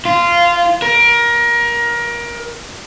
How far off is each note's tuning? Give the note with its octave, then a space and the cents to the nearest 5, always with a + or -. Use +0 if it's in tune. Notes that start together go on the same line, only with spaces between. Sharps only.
F4 -15
A#4 +25